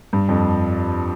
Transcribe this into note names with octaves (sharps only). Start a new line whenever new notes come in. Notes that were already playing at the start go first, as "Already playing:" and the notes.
G2
F2